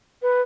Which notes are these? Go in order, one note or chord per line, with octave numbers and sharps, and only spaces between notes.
B4